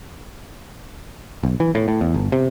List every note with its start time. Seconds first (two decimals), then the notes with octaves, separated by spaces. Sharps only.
1.43 B1
1.60 E3
1.75 A2
1.88 A2
2.01 E2
2.14 G1
2.32 C3